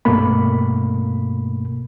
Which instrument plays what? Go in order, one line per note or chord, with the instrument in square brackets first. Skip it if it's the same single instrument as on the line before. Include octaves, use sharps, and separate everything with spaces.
[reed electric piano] C2 G2 B2 A3 A#3 B5